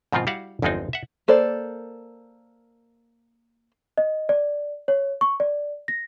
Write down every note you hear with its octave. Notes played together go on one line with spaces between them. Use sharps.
G#2 B2 D#3 F3 C4 F4
G3 E4 F#4 F5 F#5
G1 E2 F3 G#3 C4 D#4
E5 F#5
A#3 A4 C5 D5
D#5
D5
C#5
C#6
D5
A#6